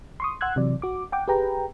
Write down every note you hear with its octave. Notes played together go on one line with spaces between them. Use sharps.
C6 C#6 D#6
F#5 C6 E6 F#6 G#6
C3 E3 F#3 D5
F#4 D6
F#5 G5 D6
G4 G#4 B4 G5 A#5